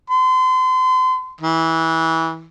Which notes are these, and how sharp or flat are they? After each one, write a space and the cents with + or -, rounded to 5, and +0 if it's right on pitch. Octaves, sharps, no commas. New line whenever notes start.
C6 -35
E3 -20